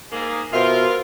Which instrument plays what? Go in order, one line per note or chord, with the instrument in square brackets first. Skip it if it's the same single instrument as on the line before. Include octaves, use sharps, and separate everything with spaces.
[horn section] G#2 A#3 G#4
[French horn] B2 [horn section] F4 [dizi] A#4 [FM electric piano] C5 E5